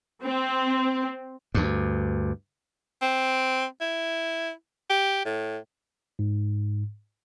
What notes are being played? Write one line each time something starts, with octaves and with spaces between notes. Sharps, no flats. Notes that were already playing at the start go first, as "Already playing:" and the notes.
C4
D2 G2
C4
E4
G4
A2
G#2